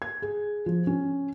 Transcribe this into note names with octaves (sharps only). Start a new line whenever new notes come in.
G#6
G#4
F3
C#4